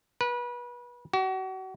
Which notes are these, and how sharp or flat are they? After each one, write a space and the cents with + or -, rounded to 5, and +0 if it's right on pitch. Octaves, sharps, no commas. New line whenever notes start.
B4 -30
F#4 +35